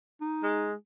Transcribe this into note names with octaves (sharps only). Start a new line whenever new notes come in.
D#4
G#3